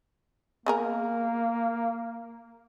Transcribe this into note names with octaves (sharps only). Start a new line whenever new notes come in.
A#3 B3 G#4 A#4